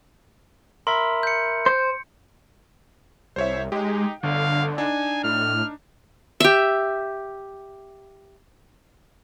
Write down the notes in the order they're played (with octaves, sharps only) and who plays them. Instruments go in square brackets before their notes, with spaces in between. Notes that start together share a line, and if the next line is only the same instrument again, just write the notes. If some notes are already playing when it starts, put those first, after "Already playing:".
[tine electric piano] A#4 E5 B5 [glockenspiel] C6
[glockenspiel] G6 C#7
[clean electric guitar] C5
[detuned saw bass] C2 [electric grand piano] C5 C#5 E5
[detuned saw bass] G#3 [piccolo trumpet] D#4 [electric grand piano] G4
[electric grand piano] G1 [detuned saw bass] D3 [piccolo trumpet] F5
[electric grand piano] D4 D#4 [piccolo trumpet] G#5
[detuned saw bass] A2 [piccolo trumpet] F6
[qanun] G4 E5